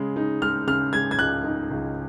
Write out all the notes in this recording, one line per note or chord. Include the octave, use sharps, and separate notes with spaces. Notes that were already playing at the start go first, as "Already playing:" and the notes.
Already playing: C#3 G#3
D#4
G#3 F6
C#3 F6
G#3 G#6
G#6
C#2 F#6
D#4
C#2